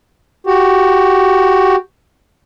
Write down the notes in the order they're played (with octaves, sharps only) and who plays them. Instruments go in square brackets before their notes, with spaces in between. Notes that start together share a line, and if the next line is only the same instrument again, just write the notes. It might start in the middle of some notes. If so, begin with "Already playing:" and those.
[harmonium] F#4 G4